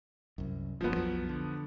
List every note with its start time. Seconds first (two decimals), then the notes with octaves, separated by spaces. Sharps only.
0.38 C2 F#2
0.81 F#1 G2 F3 B3
0.96 B1 F2 F#3
1.29 D3